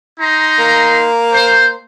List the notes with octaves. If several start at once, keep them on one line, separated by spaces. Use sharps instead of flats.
D#4 A#5 C6
A#3
C5